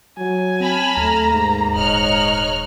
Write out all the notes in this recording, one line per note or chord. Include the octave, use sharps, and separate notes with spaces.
F#3 G#5
C4 A5 B5 F6
D#2 A3 A#5
G#2 A#3
D#1 D#4 C#5 F6 F#6